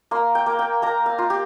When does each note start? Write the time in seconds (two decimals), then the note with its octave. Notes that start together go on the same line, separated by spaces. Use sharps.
0.11 A#3 C6
0.35 G5
0.46 A#3
0.59 G5
0.82 A#3 A#5
1.06 F5
1.18 F4
1.30 G4